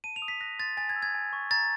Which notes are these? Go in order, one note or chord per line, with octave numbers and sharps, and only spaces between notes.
A5 D#7
F7
D#6
B6
F#6 A#6
C6 A6
G#5 A6
G#6
E6
G#6
G#5
C#6
A#5 A6